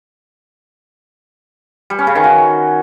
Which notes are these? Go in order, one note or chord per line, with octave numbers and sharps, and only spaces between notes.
G3
C#4
C#3
D#3
F#4